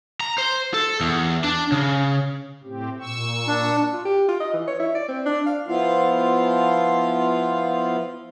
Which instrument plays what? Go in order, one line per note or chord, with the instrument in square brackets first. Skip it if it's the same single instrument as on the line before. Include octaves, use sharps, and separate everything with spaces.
[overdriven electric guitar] A#5
C5
A4
E2
D4
C#3
[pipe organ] A2 C4 G4
A#2 C#6 E6
[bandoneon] D4
[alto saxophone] F4
G4
F4
D#5
E3
C#5
E4
D5
C4
D4
F5
[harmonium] F3 B3 E4 F4 F5